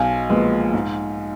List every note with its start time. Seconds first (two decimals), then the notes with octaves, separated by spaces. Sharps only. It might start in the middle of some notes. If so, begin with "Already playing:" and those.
Already playing: B1 F5 G#5
0.29 A#2 F3 G#3 B3
0.74 G#2